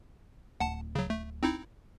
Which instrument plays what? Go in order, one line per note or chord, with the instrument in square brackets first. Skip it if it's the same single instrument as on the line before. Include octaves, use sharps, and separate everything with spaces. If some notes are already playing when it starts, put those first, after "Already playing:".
[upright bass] D1 [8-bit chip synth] F#5 A5
[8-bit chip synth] C#3 F#3
A3
C4 D#4 E4